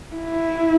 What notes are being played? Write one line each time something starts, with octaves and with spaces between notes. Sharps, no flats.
E4